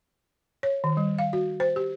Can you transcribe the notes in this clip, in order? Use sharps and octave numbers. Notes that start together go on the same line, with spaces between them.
C#5
D#3
G3
F5
F#4
C5
G4